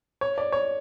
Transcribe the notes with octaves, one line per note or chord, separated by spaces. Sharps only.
C#5
D5
C#5